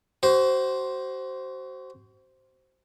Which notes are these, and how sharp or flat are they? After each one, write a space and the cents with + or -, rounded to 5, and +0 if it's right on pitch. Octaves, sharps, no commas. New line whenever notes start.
F#4 +35 C5 +0